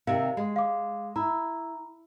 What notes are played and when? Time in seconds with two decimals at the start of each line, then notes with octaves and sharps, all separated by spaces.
0.07 C3 D#3 E5 F5
0.37 G#3
0.56 F5 D6
1.16 E4 A#5